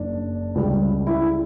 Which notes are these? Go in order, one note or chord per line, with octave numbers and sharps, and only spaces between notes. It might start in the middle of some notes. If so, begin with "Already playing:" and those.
Already playing: F#1 D4
C#2 C#3 G3
E4